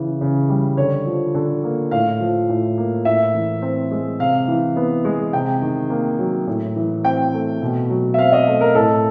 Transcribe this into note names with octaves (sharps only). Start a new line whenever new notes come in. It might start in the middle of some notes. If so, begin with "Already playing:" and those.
Already playing: C#3 E3
C#3
G3
D3 C#5
F3
D3
A#3
A2 F5
F3
A2
A#3
A2 E5
E3
C4
G#3
C3 F5
E3
B3
G#3
C3 G5
D#3
A#3
F#3
A2
E3
C4 G5
A3
B2
F#3
E5
C4 F5
D#5
A3
A#4
A2 A4